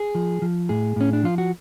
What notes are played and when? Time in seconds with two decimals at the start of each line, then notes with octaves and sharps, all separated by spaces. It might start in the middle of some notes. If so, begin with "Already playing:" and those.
Already playing: G#4
0.15 F3
0.42 F3
0.69 A2 G#4
0.96 A2 C#4
1.13 D4
1.24 F3 F4
1.38 F#4